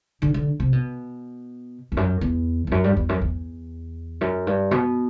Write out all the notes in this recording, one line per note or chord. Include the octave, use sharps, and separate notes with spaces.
D3
D3
C3
B2
E2
F#2
E2
E2
F#2
G2
E2
F#2
E2
F#2
G2
B2